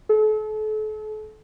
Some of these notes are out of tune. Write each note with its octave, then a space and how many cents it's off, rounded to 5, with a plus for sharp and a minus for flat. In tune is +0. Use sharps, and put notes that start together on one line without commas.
A4 -40